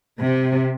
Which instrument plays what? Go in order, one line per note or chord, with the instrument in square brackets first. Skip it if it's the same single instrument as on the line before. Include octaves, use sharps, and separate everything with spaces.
[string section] C3